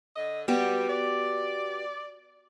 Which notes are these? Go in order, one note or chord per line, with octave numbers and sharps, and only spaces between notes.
D3 D#5
G3 B3 F#4 G4
D5